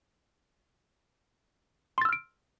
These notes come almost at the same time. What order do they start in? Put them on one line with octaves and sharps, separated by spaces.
C6 A6 E6 F6 D7